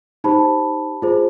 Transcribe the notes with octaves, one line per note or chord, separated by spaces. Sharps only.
D#4 G4 C5 A5 B5
F4 G#4 C5